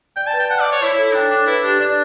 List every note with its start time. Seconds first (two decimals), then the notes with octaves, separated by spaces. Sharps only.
0.16 D5 G5
0.27 A5
0.33 B4
0.39 G5
0.50 F#5 A5
0.61 D5
0.66 D6
0.72 C#5
0.83 E4 C#5
0.93 E4
0.98 A4
1.04 E4
1.14 D4 G5
1.31 D4 D6
1.47 E4 B4
1.63 D4 G4
1.79 D4 D5